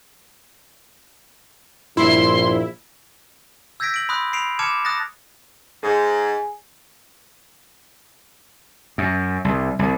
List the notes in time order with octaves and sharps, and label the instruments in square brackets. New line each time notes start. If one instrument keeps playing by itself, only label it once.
[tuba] A#1 [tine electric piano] G2 [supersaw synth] E4 [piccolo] C6
[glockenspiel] E6 G6 G#6 A#6 B6 D7
D7 F#7
B5 C6 D#6 F#6
B5 C7 D7 F7
A5 D6 F6 G#6 C#7 E7
D#6 F#6 A6 A#6
[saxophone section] G#2 [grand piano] G#4
[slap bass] F#2
C2
C2